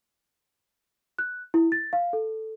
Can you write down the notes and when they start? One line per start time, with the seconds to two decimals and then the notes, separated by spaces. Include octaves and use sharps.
1.19 F#6
1.54 E4
1.72 A6
1.93 F5
2.13 A4